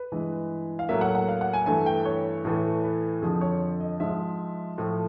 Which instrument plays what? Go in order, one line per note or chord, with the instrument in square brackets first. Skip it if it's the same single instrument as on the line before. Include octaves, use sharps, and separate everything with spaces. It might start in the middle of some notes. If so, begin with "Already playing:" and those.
Already playing: [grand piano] B4
G2 E3 G#3
F5
A2 F#3 A#3 E5
F#5
F#5
F5
F#5
G#5
G2 E3 A3 G#5
G5
C#5
A2 E3 A3
B4
F2 D3 F3 G#4
C#5
D#5
G#2 F3 G#3 E5
A2 F3 A3